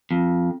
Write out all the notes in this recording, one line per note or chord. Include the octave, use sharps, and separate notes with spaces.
F2